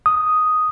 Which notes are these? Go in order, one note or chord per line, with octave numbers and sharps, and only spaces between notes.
D#6